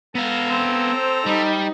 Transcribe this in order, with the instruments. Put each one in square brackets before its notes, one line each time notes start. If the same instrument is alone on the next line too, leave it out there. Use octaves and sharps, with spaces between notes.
[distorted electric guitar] B3 F5 [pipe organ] A4 A#5
[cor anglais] C4
[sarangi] C5
[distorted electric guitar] G3 [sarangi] D#4